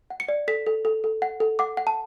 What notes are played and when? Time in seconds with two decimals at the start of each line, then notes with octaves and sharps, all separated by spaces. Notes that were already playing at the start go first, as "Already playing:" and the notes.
0.10 F#5
0.20 C#7
0.28 D5
0.48 A4 B6
0.67 A4
0.85 A4
1.04 A4
1.22 F#5
1.40 A4
1.59 F#5 D6
1.77 F#5
1.87 A5